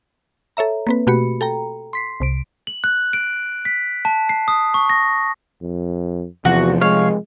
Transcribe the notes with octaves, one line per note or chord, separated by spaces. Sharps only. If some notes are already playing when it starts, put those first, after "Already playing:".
A4 C#5 E5 A#5
A#3 C4 B4
B2 A3 F#4 G4 B5 C#7
A4 G5 A#5
C6 B6 C7
C2 C3 D7
F#7
F#6
D7
B6
A5
C7
D#6
C#6
A#6
F2
E2 C3 F3 F#4
G#3 C#5 F5